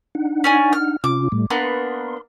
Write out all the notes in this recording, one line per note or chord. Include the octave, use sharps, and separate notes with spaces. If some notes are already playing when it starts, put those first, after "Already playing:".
D4 D#4 F#5
C#4 D5 G#5
F6
C3 C#4 F4 D6
A2 G3 A3
A#3 B3 D4 C6